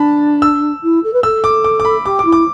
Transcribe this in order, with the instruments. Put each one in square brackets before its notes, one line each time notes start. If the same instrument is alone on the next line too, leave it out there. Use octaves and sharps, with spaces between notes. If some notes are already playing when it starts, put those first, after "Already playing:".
Already playing: [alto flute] D4 [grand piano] A5 B5
[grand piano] E6
[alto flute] E4
A4
B4
[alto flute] A4 [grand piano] E6
[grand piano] D6
D6
D6
B5
[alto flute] G4 [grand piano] D6
[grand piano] D6
[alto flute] E4
[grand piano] D6